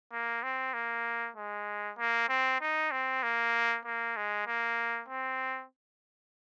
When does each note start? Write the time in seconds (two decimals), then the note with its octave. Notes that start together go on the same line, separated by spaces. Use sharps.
0.12 A#3
0.43 C4
0.74 A#3
1.36 G#3
1.98 A#3
2.29 C4
2.61 D#4
2.91 C4
3.23 A#3
3.86 A#3
4.17 G#3
4.47 A#3
5.09 C4